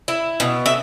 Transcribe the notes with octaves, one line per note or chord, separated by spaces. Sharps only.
E4
B2
E5